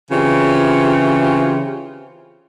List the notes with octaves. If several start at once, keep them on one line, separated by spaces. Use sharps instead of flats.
C#3 E3 C4 F4 G4